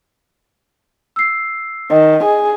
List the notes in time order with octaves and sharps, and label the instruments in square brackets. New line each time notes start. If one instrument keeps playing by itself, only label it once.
[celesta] E6 C7
[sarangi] D#3 [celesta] D#5
[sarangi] G#4